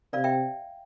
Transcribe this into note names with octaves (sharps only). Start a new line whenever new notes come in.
C3 D5 F5
E5 G5